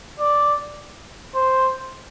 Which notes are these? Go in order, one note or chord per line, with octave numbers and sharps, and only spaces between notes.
D5
C5